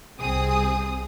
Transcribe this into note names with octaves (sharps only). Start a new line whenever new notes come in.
C2 C4 G#4 D#6